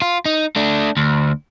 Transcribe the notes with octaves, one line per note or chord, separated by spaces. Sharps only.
F4
D#4
A3 D4
D2